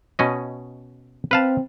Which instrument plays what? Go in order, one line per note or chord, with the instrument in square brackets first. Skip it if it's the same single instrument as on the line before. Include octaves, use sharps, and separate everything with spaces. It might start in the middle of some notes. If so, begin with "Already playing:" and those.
[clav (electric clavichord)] B2 C#4 D#5
[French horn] C4 [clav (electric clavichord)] B4 F5 A5